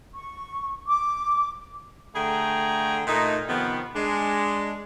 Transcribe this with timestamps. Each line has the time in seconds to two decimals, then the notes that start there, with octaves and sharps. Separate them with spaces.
0.15 C#6
0.87 D6
2.14 D3 A3 G#4 G5 A#5
3.07 A#2 A3 D#4
3.47 C3 D#3 F3 B3
3.94 G#3 D4